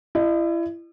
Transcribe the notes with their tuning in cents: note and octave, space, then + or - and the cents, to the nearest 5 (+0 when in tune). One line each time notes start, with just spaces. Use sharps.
E4 +30 D#5 -35